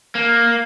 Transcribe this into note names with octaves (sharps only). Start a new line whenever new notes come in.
A#3